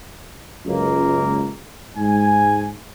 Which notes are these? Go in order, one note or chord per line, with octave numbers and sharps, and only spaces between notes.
C#2 F#2 A#3
G#2 G#5